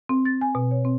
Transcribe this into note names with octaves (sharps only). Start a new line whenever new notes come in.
C4
A6
G#5
B2
C#5
C4